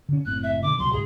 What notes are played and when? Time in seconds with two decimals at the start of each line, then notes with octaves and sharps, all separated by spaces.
0.09 D3 C#4
0.26 F#1 A2 C4 F#6
0.43 E5
0.62 B2 D3 D6
0.79 C#2 B2 F#3 C6
0.93 C2 G#2 G#4